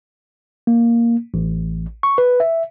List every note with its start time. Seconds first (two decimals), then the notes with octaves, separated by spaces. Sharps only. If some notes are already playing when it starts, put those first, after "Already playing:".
0.67 A#3
1.34 A1
2.03 C#6
2.18 B4
2.40 E5